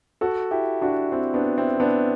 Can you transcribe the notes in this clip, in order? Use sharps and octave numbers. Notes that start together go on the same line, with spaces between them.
F#4 A4
E4 G4
D4 F#4
C4 E4
B3 D4
C4 E4
B3 D4